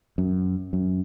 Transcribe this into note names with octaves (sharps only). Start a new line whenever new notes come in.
F#2
F#2